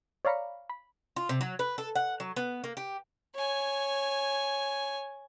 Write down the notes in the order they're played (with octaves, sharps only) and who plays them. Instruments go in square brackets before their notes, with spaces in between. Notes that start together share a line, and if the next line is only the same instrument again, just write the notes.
[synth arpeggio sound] C#5 D5 F5 A#5 B5 C#7
B5
[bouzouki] F4
C3
F#3
B4
A4
F#5
F#3
B3
A#3
G4
[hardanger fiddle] C#5 G#5